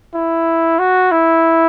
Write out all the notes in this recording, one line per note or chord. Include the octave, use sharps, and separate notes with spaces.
E4
F#4
E4